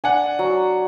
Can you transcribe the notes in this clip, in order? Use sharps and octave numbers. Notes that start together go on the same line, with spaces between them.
D4 F#5 G#5
F#3